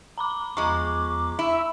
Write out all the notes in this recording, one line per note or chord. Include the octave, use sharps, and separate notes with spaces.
A#5 B5 D6
E2 F3 G#3 A#5 C#6 D6
E4 E5 E6